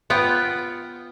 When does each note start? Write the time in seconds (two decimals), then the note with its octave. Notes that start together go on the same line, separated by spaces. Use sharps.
0.10 B3 F4 G5